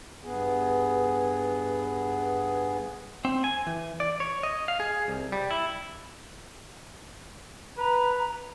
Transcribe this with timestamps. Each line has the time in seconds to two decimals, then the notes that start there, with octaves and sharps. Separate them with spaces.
0.24 G2 B3 G#4
3.25 C4
3.44 G#5
3.67 E3
4.00 D5
4.20 C#5
4.43 D#5
4.68 F5
4.80 G#4
5.08 C2
5.32 G3
5.51 E4
7.78 B4 A#5